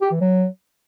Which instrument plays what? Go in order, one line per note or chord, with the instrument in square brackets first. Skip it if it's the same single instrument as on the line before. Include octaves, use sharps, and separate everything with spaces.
[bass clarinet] G4
E3
F#3